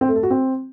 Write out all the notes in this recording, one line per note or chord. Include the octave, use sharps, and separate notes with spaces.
C4
A3
A4
F#4
C4